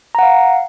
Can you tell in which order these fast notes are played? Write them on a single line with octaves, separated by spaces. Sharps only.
A#5 F#5 F5